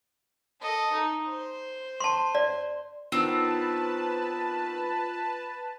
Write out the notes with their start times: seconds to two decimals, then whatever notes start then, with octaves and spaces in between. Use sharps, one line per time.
0.61 A4 D#5
0.93 D#4
1.26 C5
2.00 A5 C6
2.35 D5
3.12 D#3 B3 C4 D4 F4 B4 A5